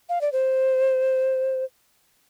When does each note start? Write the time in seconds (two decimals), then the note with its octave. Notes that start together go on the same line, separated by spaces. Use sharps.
0.09 F5
0.21 D5
0.32 C5